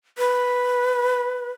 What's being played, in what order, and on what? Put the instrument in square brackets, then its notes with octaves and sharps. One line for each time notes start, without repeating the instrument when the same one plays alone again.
[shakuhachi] B4